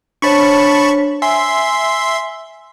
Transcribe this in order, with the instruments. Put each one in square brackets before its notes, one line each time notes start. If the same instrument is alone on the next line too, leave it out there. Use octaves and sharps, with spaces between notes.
[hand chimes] D4 C5 C#5 [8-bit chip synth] A5 B5 C#6
[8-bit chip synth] E5 C6 [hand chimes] G#5